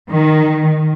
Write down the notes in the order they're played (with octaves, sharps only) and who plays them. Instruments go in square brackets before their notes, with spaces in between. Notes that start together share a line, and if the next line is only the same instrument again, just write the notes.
[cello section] D#3